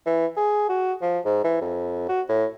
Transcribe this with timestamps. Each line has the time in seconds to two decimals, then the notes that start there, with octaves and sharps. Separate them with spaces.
0.06 E3
0.37 G#4
0.69 F#4
1.02 F3
1.25 G#2
1.44 E3
1.61 F2
2.09 F#4
2.29 A2